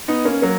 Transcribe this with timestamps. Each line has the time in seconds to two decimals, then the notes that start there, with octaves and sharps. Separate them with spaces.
0.08 B3 D#4
0.25 A#3 C#4
0.42 F#3 A#3